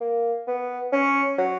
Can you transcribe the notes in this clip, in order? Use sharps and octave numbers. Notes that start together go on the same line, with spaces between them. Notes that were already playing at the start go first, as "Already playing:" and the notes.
A#3
B3
C#4
F#3